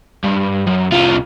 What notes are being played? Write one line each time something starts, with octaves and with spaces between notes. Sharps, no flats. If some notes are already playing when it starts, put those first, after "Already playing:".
G2
F#2
C2 F4